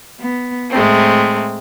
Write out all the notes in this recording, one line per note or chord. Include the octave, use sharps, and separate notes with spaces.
B3
A2 G#3 A3 C4